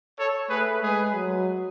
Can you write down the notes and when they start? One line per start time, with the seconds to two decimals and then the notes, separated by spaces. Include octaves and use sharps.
0.17 A4 C#5
0.49 A3 G#4 B4
0.81 G#3 G#4 B4
1.14 F#3